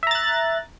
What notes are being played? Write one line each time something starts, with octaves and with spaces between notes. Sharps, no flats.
E5 A#5 F#6 A6